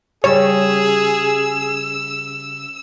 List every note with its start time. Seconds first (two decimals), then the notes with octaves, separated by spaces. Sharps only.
0.24 C#3 G3 G#4 C#5 E6